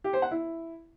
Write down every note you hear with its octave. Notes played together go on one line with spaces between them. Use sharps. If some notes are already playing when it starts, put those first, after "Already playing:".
G4
C5
F#5
E4